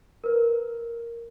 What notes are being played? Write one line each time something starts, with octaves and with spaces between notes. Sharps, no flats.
A#4 B4